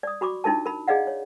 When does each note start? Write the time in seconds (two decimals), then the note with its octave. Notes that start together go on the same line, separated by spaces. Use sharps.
0.03 D5 D#6
0.21 F#4 B5 C#6 D6
0.44 D4 D#4 F4 A#4 A5
0.66 A#4 B5
0.88 G#4 D5 D#5 F5 F#5
1.07 C#5